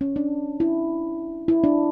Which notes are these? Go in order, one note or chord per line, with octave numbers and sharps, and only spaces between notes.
C#4
D4
E4
E4
D4